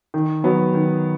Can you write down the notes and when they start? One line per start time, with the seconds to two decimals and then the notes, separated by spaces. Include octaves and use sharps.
0.14 D#3
0.44 F#3 B3
0.74 D#3